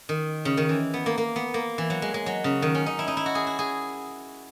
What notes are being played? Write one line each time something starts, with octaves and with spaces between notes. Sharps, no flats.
D#3
C#3
D#3
E3
B3
A#3
A#3
B3
A#3
E3
F#3
G#3
G#3
F#3
C#3
D#3
C#4
D#4
E4
D#4
E4
F#4
G#4
F#4
G#4